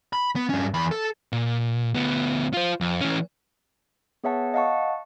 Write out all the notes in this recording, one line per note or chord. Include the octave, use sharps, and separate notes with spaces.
B5
B3
G2 C#4
E2 B5
A4
A#2
D2 B3
F4 C5
F2
E3 C#4
B3 G#4 C#5 E5 F#5 A5
D#5 F5 F#5 A5 C#6